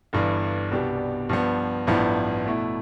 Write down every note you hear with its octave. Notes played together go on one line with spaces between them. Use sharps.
G1 G2 E3
C2 B2 B3 D4 G4
G2 F3 B3
A1 G2 F3 B3 E4
B2 A3 E4